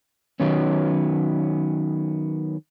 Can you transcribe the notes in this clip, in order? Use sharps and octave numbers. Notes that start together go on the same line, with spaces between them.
D#3 F#3 B3 C#4